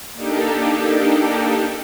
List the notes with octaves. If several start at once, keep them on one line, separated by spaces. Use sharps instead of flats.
A#3 D4 D#4 G4 A4